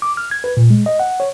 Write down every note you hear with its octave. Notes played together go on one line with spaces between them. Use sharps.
D6
F6
G#6
B4
A#2
G#3
D#5
F#5
C#5